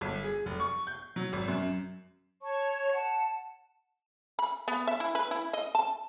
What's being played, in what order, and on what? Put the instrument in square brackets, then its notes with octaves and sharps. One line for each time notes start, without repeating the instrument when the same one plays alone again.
[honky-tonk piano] G1
G#4
F1
C#6
G6
F#3
G#1
F#2
[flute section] C#5 A5 C#6
F#5 A5
[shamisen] B5
B3
E5
E4
B4
E4
D#5
A5